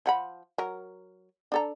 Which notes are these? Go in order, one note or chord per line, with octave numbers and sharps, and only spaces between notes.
F3 F#5 B5
F#3 A#4
D4 A4 A#5